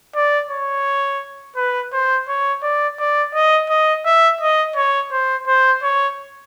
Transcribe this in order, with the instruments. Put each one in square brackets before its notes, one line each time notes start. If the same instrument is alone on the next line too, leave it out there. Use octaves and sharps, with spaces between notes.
[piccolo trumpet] D5
C#5
B4
C5
C#5
D5
D5
D#5
D#5
E5
D#5
C#5
C5
C5
C#5